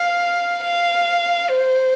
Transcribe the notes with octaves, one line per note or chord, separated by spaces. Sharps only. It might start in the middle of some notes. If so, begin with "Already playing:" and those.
Already playing: F5
F5
C5